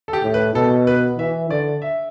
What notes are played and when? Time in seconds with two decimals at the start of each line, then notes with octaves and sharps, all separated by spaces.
0.08 A4
0.13 G4
0.24 A2
0.34 B4
0.55 B2 A4
0.87 B4
1.18 E3 E5
1.50 D3 D5
1.82 E5